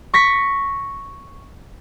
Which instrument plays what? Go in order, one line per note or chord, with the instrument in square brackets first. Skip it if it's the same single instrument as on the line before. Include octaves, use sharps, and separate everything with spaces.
[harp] C#6 A#6 B6